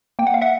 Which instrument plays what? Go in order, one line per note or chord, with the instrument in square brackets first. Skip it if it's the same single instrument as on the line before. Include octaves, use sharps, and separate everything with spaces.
[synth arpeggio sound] A#3 G5
F#5
F5
E5 F#5